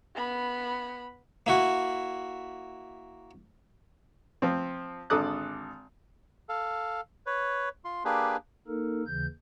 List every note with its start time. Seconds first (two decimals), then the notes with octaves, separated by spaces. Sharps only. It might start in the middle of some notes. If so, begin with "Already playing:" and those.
0.15 B3 B5
1.46 A#3 E4 F#4
4.42 F3 C4
5.10 G#1 D3 A4 D6 D#6 F#6
6.49 A4 F5
7.26 B4 C#5
7.85 F4 C6
8.05 A#3 D4 G4 G#4 B4
8.68 A#3 D#4 A4 A#4
9.07 D#2 C#3 E3 G6